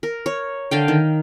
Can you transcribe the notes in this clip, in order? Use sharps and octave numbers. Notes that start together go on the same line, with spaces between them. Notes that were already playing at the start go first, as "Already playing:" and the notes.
A#4
C#5
D3 F5 G5
D#3